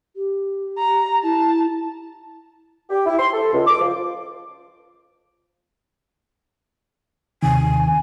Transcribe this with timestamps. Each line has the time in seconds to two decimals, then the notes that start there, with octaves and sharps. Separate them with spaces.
0.16 G4
0.79 A#5
1.23 E4 A5
2.90 G4
3.06 E4
3.19 C6
3.33 A4
3.53 C#2
3.66 D6
3.81 F3
7.43 D#2 C3 D#3 G#5